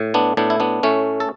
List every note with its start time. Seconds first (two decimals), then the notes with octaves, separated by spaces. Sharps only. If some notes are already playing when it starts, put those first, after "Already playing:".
Already playing: A2
0.14 B3 D4
0.37 A2 B3 D4
0.50 E4
0.60 B3 D4
0.83 A2 A3 C#4
1.20 A4